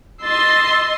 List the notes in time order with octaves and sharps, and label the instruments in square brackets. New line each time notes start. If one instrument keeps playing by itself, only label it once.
[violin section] D#5 C6 [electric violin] E6 A6